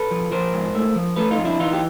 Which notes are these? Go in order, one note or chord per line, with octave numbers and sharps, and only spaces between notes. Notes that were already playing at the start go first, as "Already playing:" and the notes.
Already playing: A4 B4
F3
F3 A#4 C5
G#2
A3
F3
A3 A4 B4
D#4 F4
F2
D4 E4
E3 D#4 F4
G4